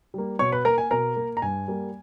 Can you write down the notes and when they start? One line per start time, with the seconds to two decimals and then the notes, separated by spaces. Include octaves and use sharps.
0.14 G3 A#3
0.39 B2 C#5 C#6
0.52 B4 B5
0.65 A#3 A#4 A#5
0.78 G#5
0.91 B2 A#4 A#5
1.17 A#3
1.37 A#5
1.42 G2 G#5
1.68 G3 A#3